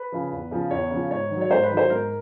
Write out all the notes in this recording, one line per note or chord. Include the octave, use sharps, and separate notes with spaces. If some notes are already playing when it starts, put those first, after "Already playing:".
Already playing: B4
C#3 F3
E2
C#3 F3
E2 C#5
C#3 F3
G#2 C#5
D#3 F#3
C#5
G#2 C5
B4
D#3 F#3
C5
G#2 A#4